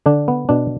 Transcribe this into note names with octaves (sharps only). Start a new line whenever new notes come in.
D3 D4
B3
B2 D4